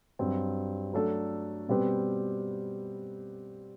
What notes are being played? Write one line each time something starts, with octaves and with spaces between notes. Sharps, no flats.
G2 F#3 C4
F#3 A3 D4 A4
B2 G3 C4 G4 B4